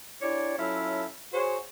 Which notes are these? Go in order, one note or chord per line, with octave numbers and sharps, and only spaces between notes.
D4 E4 G4 C#5 D5
F#3 C#4 E4 F4 A4 E5
F#4 G#4 C5 C#5